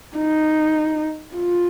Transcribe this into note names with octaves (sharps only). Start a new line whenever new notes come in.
D#4
F4